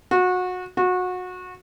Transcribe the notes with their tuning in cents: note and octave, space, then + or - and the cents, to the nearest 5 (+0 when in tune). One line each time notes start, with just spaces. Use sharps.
F#4 -25
F#4 -25